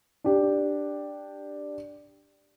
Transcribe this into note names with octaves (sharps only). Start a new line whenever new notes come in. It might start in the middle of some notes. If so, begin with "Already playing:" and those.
D4 G4